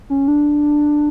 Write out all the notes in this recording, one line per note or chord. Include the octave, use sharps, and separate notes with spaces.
C#4
D4